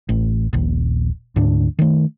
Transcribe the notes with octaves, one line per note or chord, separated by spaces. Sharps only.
A1
D#1 A#1
D2 G#2 D4
D#3 A3